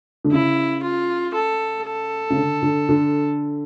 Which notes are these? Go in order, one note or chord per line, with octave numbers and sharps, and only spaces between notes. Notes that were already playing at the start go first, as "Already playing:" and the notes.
D3
C#3 E4
F4
A4
A4
C#3
D3
D3
D3